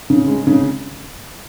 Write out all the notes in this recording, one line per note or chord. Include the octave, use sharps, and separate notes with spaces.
C#3
G#3
C#3